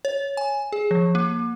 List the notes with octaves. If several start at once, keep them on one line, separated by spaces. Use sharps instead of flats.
C#5
G#5
G#4
F3
A#3